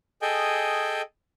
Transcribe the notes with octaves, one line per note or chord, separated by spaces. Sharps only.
G#4 A4 D#5 G5 G#5